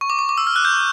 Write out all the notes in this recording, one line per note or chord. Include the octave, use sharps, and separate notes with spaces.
C#6
D6
C#6
D6
E6
F6
F#6
G6